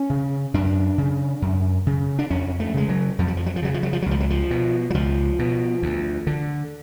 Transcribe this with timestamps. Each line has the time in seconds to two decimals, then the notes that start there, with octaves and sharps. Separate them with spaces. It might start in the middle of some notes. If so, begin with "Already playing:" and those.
Already playing: C#4
0.10 C#3
0.54 F#2 D4
0.98 C#3
1.42 F#2
1.87 C#3
2.19 D4
2.30 F2 C#4
2.60 A3
2.74 C#3 G#3
2.89 F#3
3.19 F2 F3
3.28 F#3
3.37 F3
3.46 F#3
3.56 F3
3.62 C#3 F#3
3.74 F3
3.83 F#3
3.93 F3
4.02 F#3
4.06 C#2 F3
4.20 F#3
4.30 F3
4.51 B2
4.90 F#3
4.94 C#2 F3
5.39 B2
5.82 D2
6.27 D3